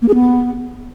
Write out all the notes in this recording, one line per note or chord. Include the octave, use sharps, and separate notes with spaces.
A#3
G#4
B3